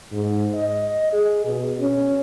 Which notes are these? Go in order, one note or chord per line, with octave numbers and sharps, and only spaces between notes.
G#2
D#5
G#4
B2
C#4